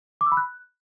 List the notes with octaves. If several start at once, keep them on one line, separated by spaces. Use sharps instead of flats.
D6
E6
B5
F#6